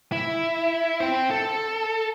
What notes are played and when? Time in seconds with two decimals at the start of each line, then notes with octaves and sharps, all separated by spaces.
0.12 E4
1.00 C5 G5
1.31 A4